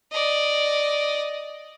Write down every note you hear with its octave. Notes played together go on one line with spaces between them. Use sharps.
D5 D#5